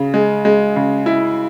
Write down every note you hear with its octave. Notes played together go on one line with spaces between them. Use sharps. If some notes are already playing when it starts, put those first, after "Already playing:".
Already playing: C#3
G#3
G#3
C#3
E4